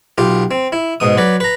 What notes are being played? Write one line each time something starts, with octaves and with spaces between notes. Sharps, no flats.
B1 F4 G4
C4
E4
G#2 B2 D#6
F#3 B4 D5
B4 A#5